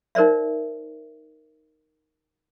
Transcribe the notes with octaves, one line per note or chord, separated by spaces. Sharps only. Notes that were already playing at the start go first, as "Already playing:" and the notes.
D#4 A#4 C5 D5 E5